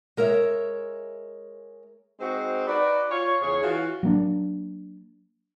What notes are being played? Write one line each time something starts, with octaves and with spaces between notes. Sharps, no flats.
G#3 A#4 C#5 E5
G#3 C4 D#4 F#4 C5
D#4 F#4 B4 D5
F4 C#5
E2 C#3 G#4 C#5
E3 C#4 F4 F#4
F#3 A#3 D4